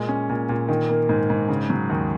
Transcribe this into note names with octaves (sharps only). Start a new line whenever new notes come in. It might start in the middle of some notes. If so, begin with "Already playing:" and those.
Already playing: A#2 G#3
C#4
A#2
A#2
D#3
A#3
G#2
G#2
C#3
F#3
D#2